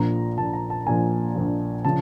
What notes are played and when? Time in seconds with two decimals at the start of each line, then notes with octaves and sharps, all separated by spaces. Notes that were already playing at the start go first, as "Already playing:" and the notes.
Already playing: A#1 A#2 F3 A#5
0.37 A#1 A#2 F3 A5
0.53 A#5
0.70 A5
0.86 A#1 A#2 F3 G#5
1.35 A#1 A#2 F3
1.85 C#3 F3 A5